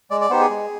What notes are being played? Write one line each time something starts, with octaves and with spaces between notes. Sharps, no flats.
G#3 D5
D5
B3 D#4 G4 C5
G#4
G#3